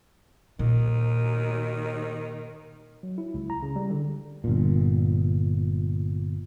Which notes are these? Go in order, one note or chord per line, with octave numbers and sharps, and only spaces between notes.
A#2 D#3
F#3
E4
C#2
A#5
C#3
G3
D3
G1 A#2